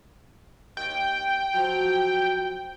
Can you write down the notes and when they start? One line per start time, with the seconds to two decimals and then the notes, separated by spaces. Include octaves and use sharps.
0.77 D#2 G5
1.54 F3 F#3